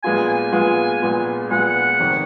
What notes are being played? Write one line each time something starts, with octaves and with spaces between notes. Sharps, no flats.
A#2 G#3 B3 F4 G#5
G#5
A#2 G#3 B3 F4
A#2 G#3 B3 F4
A#2 G#3 B3 F4 F#5
F1 F2 D#3